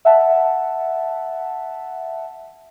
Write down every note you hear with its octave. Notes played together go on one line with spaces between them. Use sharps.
E5 F#5 A5